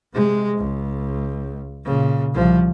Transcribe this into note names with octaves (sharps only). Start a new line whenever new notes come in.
C3 G#3
C#2
A#2 C#3
C2 F3